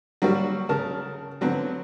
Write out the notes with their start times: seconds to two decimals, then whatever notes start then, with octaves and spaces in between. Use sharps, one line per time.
0.22 F#3 G3 A#3 F#4
0.69 C#3 A#4 A5
1.41 D3 F#3 B3 C4